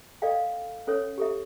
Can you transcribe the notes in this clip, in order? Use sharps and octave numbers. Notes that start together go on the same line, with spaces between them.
A4 D5 D#5 F5 G5
C#4 A4 C#5
G4 A4 E5